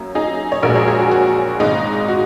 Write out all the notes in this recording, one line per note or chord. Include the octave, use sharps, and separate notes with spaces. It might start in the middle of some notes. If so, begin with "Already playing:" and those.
Already playing: F#2 F#3 A#3
D#4 G#4
C#5
A#1 A#2 G#3 F#4 A#4
G#4 C#5
G#4
F#4
F#4
G#1 G#2 G#3 D#4
F#4